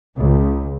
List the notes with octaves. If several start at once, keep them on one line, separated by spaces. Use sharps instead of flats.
C#2